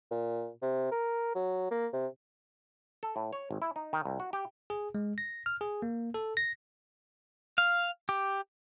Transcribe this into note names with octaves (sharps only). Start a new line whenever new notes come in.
A#2
C3
A#4
F#3
A#3
C3
A4
A2
C#5
G#1
E4
D#4
D#3
C2
F#4
G4
G#4
G#3
A#6
F6
G#4
A#3
A4
A#6
F5
G4